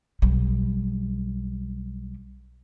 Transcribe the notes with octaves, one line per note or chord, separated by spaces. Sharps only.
B1 G3